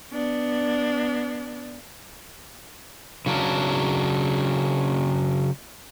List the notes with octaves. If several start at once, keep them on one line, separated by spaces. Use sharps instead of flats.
B3 D4
C#3 F#3 C#4 D4